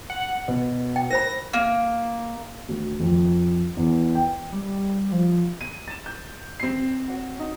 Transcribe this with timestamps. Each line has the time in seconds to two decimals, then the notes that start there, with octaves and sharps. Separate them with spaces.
0.10 F#5
0.48 B2
0.96 G5
1.10 A#4 C5 B5 A#6
1.53 A#3
2.69 D2
3.00 F2
3.77 E2
4.15 G5
4.52 G3
5.12 F3
5.61 D#7
5.88 A6 E7
6.06 G6
6.60 C4 C7
7.08 F#4 C#5
7.39 D#4